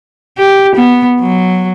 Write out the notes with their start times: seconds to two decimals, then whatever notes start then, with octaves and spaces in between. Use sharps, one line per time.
0.38 G4
0.76 B3
1.20 F#3